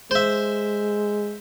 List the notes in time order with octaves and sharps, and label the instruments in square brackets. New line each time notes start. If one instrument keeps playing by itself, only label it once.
[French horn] G#3 [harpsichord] C5 E5